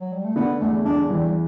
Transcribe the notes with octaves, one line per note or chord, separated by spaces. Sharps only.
F#3
G3
A3
D3 B3
E2 A3
E2 D4
E3 G3